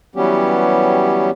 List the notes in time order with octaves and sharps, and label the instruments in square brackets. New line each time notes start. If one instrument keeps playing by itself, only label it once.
[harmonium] E3 F#3 G3 B3 C#4 G4